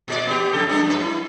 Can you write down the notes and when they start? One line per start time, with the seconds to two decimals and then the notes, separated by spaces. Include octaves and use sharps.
0.08 A#2 G#4 D5
0.27 B3 G4
0.53 F#2 C#3 A4
0.69 G3 B3 D4
0.86 F#2 B4
1.01 E4